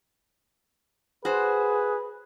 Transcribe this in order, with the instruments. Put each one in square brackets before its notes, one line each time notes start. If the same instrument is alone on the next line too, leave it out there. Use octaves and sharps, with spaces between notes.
[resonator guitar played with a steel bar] F#4 C5 [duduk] G#4 [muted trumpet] B4